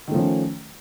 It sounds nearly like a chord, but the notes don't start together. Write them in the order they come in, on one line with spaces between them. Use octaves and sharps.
D#3 A3 F3 C#4